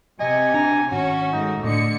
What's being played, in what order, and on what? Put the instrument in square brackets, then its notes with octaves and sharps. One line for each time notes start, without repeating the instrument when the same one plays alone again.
[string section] C3 [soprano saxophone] D#5 [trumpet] G#5
[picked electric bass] D4 [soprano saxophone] A#5
[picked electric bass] G#1 [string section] C#4 [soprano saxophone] F#4
[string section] G#2 A3 [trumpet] D#4
[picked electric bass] A2 A3 [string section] D3 C#7 [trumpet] D#5